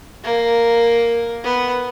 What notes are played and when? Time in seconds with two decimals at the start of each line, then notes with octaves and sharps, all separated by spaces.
0.24 A#3
1.44 B3